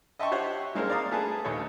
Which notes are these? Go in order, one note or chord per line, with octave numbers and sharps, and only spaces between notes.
D#5 E5 G5 A5 C6 C#6
G4 C5 C#5 E5 F#5
G3 G#3 A#3 C4 D4 A#4
D5 F5 A#5 D#6
A3 G#4 B4 A5
A#1 D#2 A3 C#5